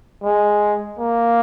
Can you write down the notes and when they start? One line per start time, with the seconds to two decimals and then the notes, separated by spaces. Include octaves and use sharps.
0.24 G#3
0.99 A#3